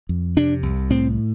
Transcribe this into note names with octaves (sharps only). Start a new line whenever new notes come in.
F2
C3 D4
C2
A2 C4